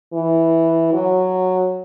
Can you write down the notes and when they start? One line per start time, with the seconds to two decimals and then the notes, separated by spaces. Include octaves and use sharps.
0.13 E3
0.93 F#3